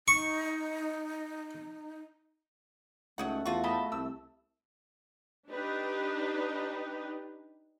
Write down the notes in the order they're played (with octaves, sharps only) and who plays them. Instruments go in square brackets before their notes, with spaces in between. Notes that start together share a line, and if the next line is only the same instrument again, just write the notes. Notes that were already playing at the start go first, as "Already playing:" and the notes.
[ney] D#4 [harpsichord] C#6
[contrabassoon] C#2 [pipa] F#3 D#4 F#5 [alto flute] A3
[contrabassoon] E2 [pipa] F4 F#4
[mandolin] D#5 A5 B5
[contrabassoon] C2 [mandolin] E6
[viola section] D4 D#4 G4 B4